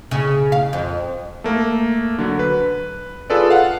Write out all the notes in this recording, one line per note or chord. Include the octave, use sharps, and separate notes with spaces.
C#3
F5
F2
A3 A#3
D3 F#3
B4
F4 G#4 A4 B4 D5
F5 F#5